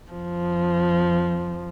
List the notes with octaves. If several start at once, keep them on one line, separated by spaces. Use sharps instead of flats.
F2 F3